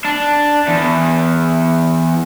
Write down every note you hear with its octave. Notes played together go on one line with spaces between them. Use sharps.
D4
E2